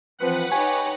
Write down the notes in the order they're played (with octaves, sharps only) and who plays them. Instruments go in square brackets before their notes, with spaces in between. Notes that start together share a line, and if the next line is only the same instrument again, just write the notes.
[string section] E3 F3 C4 [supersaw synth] B4 F#5
[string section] D#4 G4 C#5 [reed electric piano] G#5